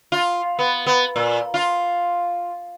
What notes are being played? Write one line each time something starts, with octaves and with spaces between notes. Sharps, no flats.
F4
B3
B3
A#2
F4